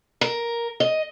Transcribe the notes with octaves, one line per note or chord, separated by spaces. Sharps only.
A#4
D#5